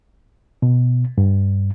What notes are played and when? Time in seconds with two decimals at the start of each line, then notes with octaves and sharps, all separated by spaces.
0.62 B2
1.18 G2